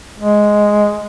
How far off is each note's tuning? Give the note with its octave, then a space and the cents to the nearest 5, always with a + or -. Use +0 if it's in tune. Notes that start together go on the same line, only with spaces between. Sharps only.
G#3 +0